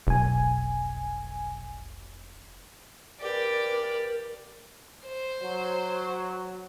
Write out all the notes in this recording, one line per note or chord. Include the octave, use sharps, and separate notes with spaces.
F1 B1 G#5
G4 A#4 B4 D5
C5
F#3